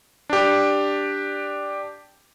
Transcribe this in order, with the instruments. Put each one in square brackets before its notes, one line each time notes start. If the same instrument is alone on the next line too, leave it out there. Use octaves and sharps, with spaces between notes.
[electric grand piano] D4 G4